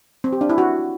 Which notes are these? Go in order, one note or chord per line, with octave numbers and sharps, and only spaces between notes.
C4
G4
D4
E4
F#4